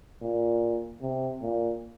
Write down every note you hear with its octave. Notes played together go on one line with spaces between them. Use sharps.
A#2
C3
A#2